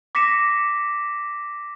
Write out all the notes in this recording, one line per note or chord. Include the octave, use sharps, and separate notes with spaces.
D6 A#6 B6 C#7 E7